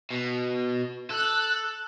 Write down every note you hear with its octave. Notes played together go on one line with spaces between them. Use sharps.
B2
A4 F#6